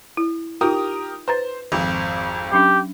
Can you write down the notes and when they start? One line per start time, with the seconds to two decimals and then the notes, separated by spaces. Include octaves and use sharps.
0.17 E4
0.61 D#4 F4 G4 A#4 D#6
1.28 B4 C5 A#5 A6
1.72 G#1 F2
2.52 F#3 C#4 D4 G4